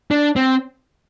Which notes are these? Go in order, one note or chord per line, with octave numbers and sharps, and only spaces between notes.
D4
C4